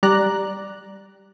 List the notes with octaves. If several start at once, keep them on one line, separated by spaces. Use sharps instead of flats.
G3 D5 A#5 F#6